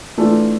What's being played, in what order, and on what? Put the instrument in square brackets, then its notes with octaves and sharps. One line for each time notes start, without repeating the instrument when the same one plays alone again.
[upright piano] E3 A3 D4 F4 A4